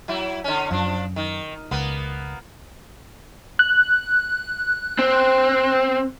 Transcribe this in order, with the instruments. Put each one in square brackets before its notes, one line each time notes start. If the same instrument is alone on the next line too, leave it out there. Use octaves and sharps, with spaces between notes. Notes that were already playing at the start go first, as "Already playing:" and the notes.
[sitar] F#3 E4
D3 C#4
[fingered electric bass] F#2 [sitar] F3 D4
[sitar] D#3
[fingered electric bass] C#2 [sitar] A#3 B3
[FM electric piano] F#6
[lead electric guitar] C4